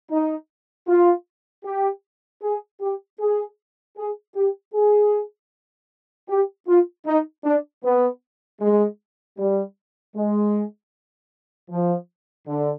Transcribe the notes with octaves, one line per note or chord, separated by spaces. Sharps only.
D#4
F4
G4
G#4
G4
G#4
G#4
G4
G#4
G4
F4
D#4
D4
B3
G#3
G3
G#3
F3
D3